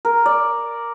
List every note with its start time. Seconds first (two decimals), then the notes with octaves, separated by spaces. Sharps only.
0.05 A#4
0.26 D5